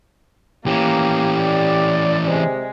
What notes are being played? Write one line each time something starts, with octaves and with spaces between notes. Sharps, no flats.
E3 A#3 C#4 G4
D5
C3 G#3